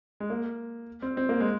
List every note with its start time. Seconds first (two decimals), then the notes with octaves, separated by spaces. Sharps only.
0.20 G#3
0.30 A#3
1.02 C4
1.17 C4
1.29 A#3
1.40 G#3